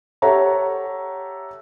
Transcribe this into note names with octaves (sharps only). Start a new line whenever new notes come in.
G4 A4 C#5 E5 F#5 A#5